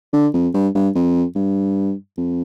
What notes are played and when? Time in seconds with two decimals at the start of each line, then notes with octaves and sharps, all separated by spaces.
0.13 D3
0.34 F2
0.54 G2
0.75 G2
0.95 F2
1.35 G2
2.17 F2